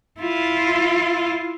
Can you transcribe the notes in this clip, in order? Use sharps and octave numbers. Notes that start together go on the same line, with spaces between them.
E4 F4